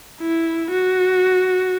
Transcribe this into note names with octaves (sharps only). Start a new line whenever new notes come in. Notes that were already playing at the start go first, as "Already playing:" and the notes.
E4
F#4